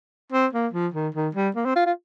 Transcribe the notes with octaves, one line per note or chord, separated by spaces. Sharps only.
C4
A#3
F3
D#3
D#3
G3
A#3
C4
F4
F4